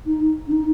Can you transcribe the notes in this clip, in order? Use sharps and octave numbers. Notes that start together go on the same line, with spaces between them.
D#4
D4
D#4